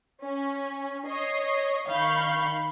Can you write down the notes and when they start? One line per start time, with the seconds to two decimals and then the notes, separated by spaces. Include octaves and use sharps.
0.24 C#4
1.08 C#5 D#5 C7
1.88 D#3 F5 B5 C#6 G6